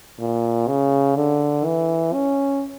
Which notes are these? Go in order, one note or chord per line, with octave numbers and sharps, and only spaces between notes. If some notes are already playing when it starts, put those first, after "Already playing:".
A#2
C#3
D3
E3
C#4